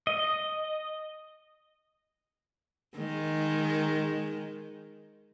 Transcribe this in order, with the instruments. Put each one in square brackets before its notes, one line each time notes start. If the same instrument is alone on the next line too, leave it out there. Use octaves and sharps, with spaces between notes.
[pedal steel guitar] D#5
[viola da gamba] D#3 G#3